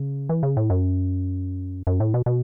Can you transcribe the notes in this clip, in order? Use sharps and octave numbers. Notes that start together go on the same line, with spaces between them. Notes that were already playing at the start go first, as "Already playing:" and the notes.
Already playing: C#3
E3
C#3
A2
F#2
F#2
A2
B2
B2